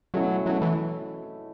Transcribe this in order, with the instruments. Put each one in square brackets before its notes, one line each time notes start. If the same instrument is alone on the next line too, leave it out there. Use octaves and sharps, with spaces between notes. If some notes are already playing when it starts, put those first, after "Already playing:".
[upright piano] B2 A3 C#4 E4 [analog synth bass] F#3
[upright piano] B2 A3 C#4 E4 [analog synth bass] F#3
[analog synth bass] E3